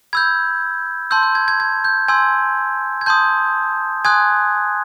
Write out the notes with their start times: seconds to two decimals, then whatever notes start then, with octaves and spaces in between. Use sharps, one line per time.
0.13 B5 E6 G6 G#6
1.11 A5 C6 E6 G6
1.23 G6
1.35 G#6
1.48 G#6
1.60 G#6
1.84 G6
2.08 G#5 C6 E6 G6 G#6
3.01 G#6
3.06 A5 C6 D#6 G6
4.05 G#5 C6 D#6 F#6 G#6